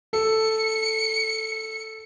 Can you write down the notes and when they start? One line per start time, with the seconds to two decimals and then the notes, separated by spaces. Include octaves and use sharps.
0.13 A4 C#7